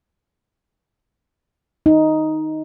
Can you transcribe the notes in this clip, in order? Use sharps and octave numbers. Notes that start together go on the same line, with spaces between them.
D#4